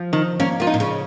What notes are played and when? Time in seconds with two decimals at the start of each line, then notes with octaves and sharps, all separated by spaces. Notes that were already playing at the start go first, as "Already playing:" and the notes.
Already playing: F3
0.13 D#3
0.40 A#3 C#4
0.60 A#3 F4
0.67 D#4
0.74 A#2
0.80 C#3